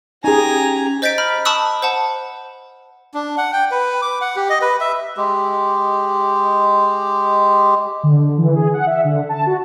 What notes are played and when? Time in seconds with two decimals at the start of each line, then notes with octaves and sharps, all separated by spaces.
0.24 C#4 D#4 G4 G#4 G#5 A#5
1.02 C5 D#5 G6 A6 B6 D7
1.18 A#5 B5 F6
1.45 A5 B5 C#6 D#6 E6 F#6
1.82 C5 F#5 A5
3.14 D4
3.37 F#5
3.53 G5
3.71 B4
4.02 D6
4.21 F#5
4.36 G4
4.49 D#5
4.61 B4
4.80 E5
5.17 G#3 G4
8.03 D3
8.38 E3
8.55 G#4
8.74 F#5
8.87 E5
9.04 D3
9.29 A5
9.47 F#4